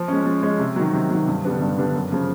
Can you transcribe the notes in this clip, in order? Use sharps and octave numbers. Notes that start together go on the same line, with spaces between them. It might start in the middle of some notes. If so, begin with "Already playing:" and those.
Already playing: F3
G#3 C#4
F3
G#3 C#4
C3
D#3 F#3
C3
D#3 F#3
G2
D3 G3 B3 D4
G2
D3 G3 B3 D4
F#2
C#3 F3